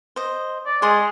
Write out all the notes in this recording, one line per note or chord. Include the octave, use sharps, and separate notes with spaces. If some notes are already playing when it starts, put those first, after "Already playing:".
C5 D#5
D5
G#3 G#4 C6